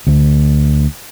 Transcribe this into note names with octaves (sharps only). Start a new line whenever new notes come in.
D2 A3